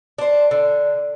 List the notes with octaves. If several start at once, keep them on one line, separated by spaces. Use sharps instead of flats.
D4 C5
D3